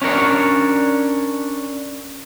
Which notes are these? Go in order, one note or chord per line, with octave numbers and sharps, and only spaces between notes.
C#4 D4 A#4 C#5